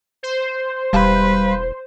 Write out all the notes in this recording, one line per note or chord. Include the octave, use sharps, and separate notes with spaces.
C5
E1 G3 B4 F5